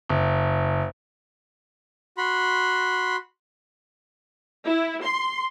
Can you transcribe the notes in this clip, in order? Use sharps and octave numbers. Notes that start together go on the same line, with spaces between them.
F#1
F#4 B5 C6
E4
C6